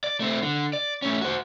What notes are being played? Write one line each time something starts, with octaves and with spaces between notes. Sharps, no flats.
D5
A3 C4
D3
D5
A3 C#4
F#4 C5